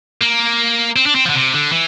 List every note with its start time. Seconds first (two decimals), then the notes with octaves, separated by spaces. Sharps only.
0.21 A#3
0.96 C4
1.06 D4
1.15 C4
1.25 F3
1.30 D3
1.35 C3
1.54 D3
1.72 E3